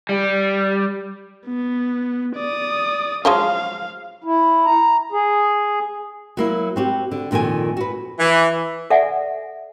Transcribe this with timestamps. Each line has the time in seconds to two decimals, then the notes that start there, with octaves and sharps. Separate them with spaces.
0.09 G3
1.47 B3
2.36 D5 D#6
3.25 F3 F#3 G#3 F5
4.24 E4
4.66 A#5
5.12 G#4
6.37 F#3 A#3 E4
6.76 C4 F#4 G4
7.12 D3
7.31 F2 A#2 D#3 A4 G#5
7.77 F#4 B4
8.20 E3
8.90 A4 D5 E5 F#5 G#5